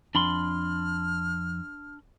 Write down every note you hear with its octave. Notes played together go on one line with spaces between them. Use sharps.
F2 D4 B5 C6 F6